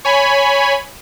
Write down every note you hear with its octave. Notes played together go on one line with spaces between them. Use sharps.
C#5 G#5 B5